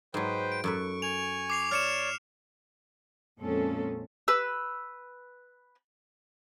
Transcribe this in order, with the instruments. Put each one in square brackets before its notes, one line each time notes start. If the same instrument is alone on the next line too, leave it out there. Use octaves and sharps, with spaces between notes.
[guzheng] G#2 F#3 [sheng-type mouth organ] B4 C5 G5
[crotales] D7
[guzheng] F#2 A4 B4 [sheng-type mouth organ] C#6
[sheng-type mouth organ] G#5 C#6 [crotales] F7
[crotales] D6 C7 F7
[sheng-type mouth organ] C#5 D5 [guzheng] A5 [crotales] F6 C#7 E7
[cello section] F2 A#2 G#3 C4 C#4 A4
[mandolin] B4 E6